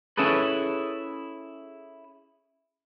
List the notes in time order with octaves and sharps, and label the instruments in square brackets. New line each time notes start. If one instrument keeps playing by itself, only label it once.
[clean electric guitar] C#4 E4 G#4 A4 B4